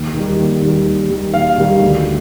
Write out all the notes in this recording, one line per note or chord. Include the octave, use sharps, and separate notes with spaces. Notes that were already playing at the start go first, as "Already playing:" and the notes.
Already playing: D#2
D#3 G3
D#2
D#3 G3
D#2
D#3 G3
D#2 F5
D#3 G3
D2